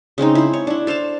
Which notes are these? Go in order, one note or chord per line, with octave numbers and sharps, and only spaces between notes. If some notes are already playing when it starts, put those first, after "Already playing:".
C#3 G#3 C4 D#4
E4 C5
C#5
D4 E4
A4 C5 F5 A5